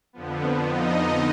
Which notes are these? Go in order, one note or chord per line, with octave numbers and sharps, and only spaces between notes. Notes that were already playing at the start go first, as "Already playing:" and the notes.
F2 D3 F3 B3
D#4 D#5